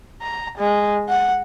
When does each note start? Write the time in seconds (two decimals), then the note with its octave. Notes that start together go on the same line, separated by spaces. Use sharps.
0.21 A#5
0.58 G#3
1.09 F#5